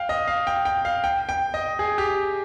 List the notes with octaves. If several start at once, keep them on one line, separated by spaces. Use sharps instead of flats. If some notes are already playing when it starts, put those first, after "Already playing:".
Already playing: F5 G5
D#5
F5
G5
G5
F5
G5
G5
D#5
G#4
G4